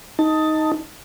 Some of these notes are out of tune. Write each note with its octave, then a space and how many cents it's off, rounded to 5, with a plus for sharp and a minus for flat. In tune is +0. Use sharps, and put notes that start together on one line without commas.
D#4 +10 A5 +15